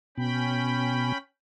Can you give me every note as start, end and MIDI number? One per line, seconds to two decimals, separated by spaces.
0.18 1.13 47
0.18 1.18 61
0.18 1.18 79
0.18 1.18 83